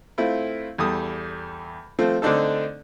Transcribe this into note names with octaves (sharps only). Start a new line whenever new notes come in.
A3 C4 E4 F4
E2 G3 A4 D#6
F3 A3 C4
D3 A3 C4 D4 D#4 A4